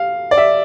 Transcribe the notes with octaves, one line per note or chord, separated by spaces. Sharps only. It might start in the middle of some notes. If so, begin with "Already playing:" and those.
Already playing: F5
D5
E5